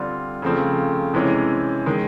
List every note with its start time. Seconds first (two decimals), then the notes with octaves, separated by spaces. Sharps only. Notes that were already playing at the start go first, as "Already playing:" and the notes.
Already playing: D3 G3 C4 F4
0.42 C#3 F3 A3 C4
1.14 C3 E3 G#3 C#4
1.86 D#3 G#3